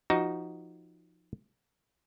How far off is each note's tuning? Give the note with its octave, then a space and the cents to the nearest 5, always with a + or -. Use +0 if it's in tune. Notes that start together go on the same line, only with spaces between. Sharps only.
F3 +0 D#4 +0 F#4 +15